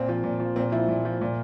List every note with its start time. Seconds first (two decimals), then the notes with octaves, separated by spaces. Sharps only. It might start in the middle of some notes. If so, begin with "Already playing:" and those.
Already playing: A#2 C4
0.09 F3
0.24 A#2
0.40 F3
0.56 A#2 C4
0.72 F3 E4
0.88 A#2
1.05 F3
1.21 A#2